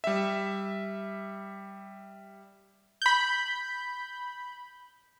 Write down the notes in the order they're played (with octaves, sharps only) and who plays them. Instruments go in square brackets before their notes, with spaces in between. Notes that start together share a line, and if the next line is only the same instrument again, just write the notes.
[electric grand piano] G3 E5
[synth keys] B5 G6